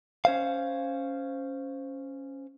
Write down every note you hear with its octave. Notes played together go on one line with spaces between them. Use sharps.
C#4 C5 F5